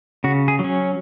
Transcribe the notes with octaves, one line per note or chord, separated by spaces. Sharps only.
C#3 F#4
G#4
F#3
C#4